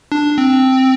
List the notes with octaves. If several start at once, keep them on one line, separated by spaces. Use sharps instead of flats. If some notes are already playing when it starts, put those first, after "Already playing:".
D4
C4